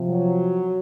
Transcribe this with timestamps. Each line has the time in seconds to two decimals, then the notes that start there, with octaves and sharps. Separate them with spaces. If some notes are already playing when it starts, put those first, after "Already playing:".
Already playing: C3 F3
0.10 F#3